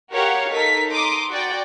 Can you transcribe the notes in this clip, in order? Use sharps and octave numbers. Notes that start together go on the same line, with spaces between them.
F#4 G4 A#4 C#5 F5 F#5
D#4 A4 A#4 B6
A#5 C6 D6 D#6
F#4 D5 G5